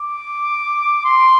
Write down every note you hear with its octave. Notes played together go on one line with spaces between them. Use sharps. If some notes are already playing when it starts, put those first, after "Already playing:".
Already playing: D6
C6